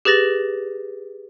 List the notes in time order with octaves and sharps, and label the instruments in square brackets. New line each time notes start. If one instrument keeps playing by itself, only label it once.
[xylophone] G4 G#4 B4 A6 A#6 F#7